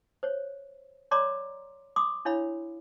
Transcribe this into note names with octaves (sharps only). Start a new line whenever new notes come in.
C5 C#5
C#5 D5 A#5 C6 D6
C6 D6 D#6
D4 E4 C#5 F5 B5